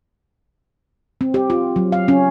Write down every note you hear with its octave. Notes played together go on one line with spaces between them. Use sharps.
C4
G4
F4
F#3
F5
C#4